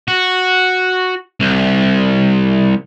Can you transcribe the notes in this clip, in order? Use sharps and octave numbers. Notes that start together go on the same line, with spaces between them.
F#4
C2